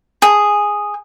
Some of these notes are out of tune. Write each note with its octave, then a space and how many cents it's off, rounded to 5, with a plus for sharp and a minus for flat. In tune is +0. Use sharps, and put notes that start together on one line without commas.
G#4 -5